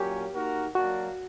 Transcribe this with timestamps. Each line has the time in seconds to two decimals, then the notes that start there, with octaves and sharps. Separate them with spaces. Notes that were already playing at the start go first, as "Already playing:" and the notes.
Already playing: A#2 F#3 A#3 C#4 G4
0.33 A#3 D#4 F#4 A#4
0.75 F#3 A#3 D4 F#4